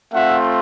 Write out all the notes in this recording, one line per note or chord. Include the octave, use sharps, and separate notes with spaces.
A3 C4 F4 E5 F#5